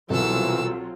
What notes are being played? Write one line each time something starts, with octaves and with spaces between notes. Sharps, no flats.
C2 B2 E3 F#3 C4 F4 A4 E6